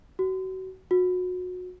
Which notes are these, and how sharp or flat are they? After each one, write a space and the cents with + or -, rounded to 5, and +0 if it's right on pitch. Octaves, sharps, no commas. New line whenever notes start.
F#4 +30
F#4 -30